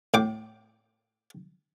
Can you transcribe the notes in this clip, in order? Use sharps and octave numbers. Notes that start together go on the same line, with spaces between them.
A2 G5 D6